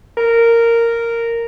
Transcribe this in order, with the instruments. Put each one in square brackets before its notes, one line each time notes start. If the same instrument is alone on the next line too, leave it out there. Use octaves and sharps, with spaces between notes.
[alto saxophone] A#4